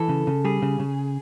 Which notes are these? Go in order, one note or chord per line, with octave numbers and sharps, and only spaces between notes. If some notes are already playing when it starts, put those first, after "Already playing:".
Already playing: E3 A4
C#3
C#3
G3 G#4
C#3
C#3